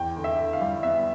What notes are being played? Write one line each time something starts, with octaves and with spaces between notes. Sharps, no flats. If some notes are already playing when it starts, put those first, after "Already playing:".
Already playing: E2 G5
D3
E5
D3
F5
G3
B3 E5